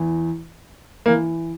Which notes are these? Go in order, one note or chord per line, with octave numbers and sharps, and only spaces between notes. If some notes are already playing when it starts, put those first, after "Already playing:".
Already playing: E2 E3
E3 A#3